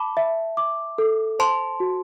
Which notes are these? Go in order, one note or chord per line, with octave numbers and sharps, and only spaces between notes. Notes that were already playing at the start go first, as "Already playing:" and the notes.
Already playing: A5 B5 D6
E5
D6
A4
C5 A5 C6
F#4